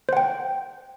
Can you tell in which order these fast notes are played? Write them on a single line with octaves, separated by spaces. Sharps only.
C5 F#5 G5